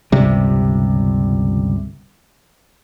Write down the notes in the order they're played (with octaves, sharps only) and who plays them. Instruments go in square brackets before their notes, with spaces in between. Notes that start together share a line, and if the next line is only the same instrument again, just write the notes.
[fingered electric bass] G1 C#2 C3 G3